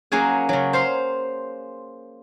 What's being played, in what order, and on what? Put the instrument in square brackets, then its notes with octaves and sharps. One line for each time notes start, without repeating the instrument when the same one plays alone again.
[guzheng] F#3 A#3 C#4 G#4 F#5 G#5
C#3 F#3
C5 F5 C6